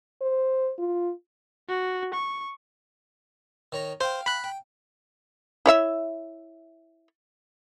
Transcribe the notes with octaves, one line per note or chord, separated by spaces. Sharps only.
C5
F4
F#4
C#6
D#3 C#5 A#5
C5 F5 G5
B5 F#6
G5
E4 C#5 E5